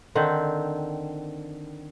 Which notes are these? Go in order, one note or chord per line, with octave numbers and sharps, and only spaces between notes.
D3 D#3 C4